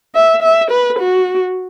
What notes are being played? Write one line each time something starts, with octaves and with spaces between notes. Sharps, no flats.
E5
E5
B4
F#4